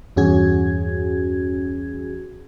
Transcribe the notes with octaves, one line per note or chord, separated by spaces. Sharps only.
E2 G2 C#4 F#4 G#4 G#6